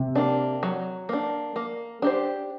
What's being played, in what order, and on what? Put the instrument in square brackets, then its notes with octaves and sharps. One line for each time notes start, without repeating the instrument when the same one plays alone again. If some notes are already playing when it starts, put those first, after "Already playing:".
Already playing: [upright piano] C3
[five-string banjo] A#3 D4
F#3
A#3 D4
A#3
D4 G4 C5